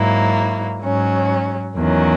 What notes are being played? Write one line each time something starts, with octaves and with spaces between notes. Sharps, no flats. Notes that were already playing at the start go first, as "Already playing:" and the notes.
Already playing: G#2 F#3 A#3 E4
G#2 F#3 C#4
E2 D#3 F#3 C#4